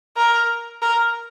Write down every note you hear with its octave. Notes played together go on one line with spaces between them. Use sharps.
A#4
A#4